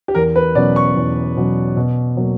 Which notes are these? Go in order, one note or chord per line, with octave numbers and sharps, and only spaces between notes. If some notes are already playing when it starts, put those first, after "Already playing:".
G4
E2 A#4
B4
B2 F#3 C#4 D5
C#6
E2
B2 F#3 C#4
B2
F#3 A#3